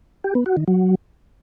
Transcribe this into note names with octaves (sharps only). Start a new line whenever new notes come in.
G4
B3
F#4
D#3
F#3